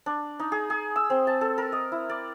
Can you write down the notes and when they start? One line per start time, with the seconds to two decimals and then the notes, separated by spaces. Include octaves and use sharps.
0.06 D4
0.40 D#4
0.52 G#4
0.70 G#4
0.96 E6
1.10 C4
1.27 A5
1.41 A4
1.58 A#4
1.72 D#5
1.92 E4
2.09 D5